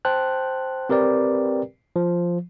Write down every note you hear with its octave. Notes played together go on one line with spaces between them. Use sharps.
C5 G5 A5 F#6
C4 G4 A#4 B4 D5 G5
F3